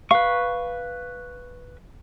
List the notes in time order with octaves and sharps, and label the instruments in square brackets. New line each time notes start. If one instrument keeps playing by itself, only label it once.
[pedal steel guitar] B4 C#6 [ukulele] F5